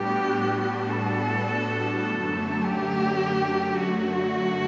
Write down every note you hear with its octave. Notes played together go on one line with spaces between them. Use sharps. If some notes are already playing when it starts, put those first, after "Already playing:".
Already playing: A2 G3 B3 D4 F#4 G4
A4
F#2 D3 F#3 A3
G4
F#4